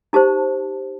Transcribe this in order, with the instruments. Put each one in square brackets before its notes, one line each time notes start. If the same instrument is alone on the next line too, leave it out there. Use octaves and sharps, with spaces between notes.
[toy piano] D#4 G4 C5 A5